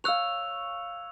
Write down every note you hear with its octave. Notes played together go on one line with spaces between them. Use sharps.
C#5 F5 E6 F#6 F7